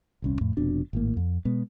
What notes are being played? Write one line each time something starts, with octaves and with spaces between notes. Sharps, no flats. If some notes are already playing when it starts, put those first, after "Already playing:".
D#1 C2 C#4
F2 A2
F1 F2 B2 D4
G#1 A2 A#3
F2
B2 G#3 B3